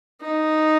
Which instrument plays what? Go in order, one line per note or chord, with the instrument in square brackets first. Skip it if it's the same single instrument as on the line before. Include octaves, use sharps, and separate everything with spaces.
[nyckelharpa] D#4